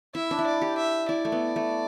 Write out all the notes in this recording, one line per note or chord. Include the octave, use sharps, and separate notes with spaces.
E4 E5
D4
E4
D5
G4
E5
E4 D5
A3
B3
A3